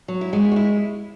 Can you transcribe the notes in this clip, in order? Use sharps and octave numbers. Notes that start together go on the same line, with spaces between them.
F#3
E4
G#3 F#4
E4
F#4
E4